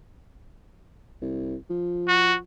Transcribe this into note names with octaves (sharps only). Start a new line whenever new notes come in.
C2
F3
F#4